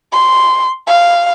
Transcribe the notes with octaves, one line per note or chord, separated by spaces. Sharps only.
C6
F5